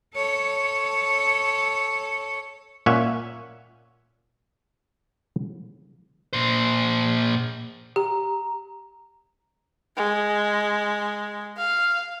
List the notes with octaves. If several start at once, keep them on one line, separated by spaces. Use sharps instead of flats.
A4 C#5
A#2 C#4 C#5 E5 F#5 G#5
A#2 C5
G4 A#5
G#3
F5